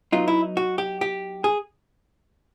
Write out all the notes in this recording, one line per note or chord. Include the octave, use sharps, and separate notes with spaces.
F#3 B3 D#4 F4
E4
F#4
G4
G4
G#4